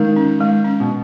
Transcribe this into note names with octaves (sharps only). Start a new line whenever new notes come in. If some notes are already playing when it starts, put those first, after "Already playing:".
Already playing: D#3 G#3
C#4
G#3
C#4
B2